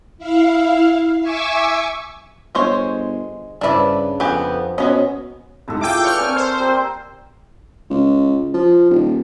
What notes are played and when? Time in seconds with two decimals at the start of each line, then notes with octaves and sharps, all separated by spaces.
0.18 E4 F5
1.20 E5 G#5 C#6 D6 E6
2.55 G1 G#3 C5 C#5
3.61 G2 C#3 D4 E4 B4 D5
4.20 F2 B3 G4 G#5
4.78 B2 G#3 B3 C#4 D#5
5.68 C2 G#2 E4 A4
5.81 E4 F4 G#4 F5 G5 D6
6.04 B4 D5 C#6 F6
6.19 C4 A#4 G#5
6.36 C5
6.60 G3 A#3 C4
7.90 C#2
8.54 F3
8.90 D#1